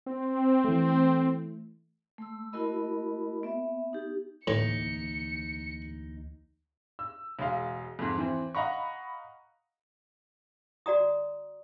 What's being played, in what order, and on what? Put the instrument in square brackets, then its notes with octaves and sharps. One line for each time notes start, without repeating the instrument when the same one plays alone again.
[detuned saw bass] C4
[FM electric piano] E3 A3
[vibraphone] A3 E6
A3 E4 F#4 A#4 D#5 B5
B3 E5
D#4 G4
[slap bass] D2 E3 A#3 [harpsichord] A2 [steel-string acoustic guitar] D#4 [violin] C#7
[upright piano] E6
E1 G#3 F5
F2 G#2
E3 C4
D#5 F5 F#5 A#5 B5 C#6
[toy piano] F#4 D5 A#5 D#6